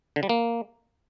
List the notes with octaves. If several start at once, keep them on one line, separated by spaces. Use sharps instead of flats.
D3
G3
A#3